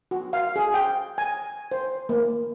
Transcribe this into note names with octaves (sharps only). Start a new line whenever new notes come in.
F#4
F5
G#4
G5
G#5
C5
A#3